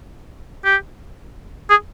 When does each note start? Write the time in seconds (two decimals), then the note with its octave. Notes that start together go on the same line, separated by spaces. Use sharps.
0.65 G4
1.70 G#4